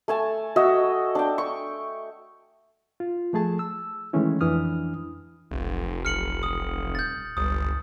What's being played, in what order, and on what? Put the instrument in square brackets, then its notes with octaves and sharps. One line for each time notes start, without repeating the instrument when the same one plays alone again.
[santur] A3 G#5 A5
F#4 D#5 E5
D4 G5
C#6
[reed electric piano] F4
F3 A3 G#4 A5
E6
D#3 E3 G#3 A3 C#4 E4
F2 E3 D4 E4 D#6 F6
[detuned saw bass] F1 [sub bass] B1
[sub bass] B1 [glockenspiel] F6 C#7 F#7
[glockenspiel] D#6
[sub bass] D#1 [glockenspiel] G6 A6
[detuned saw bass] G1 [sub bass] C#2 [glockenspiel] D#6